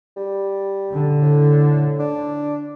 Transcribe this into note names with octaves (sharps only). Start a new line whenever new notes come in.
G3
D3
A2
D4